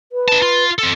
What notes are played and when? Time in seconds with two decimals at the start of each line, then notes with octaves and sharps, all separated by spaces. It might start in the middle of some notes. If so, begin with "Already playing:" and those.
0.12 B4
0.28 D#4 A5
0.42 F4
0.78 C4 A4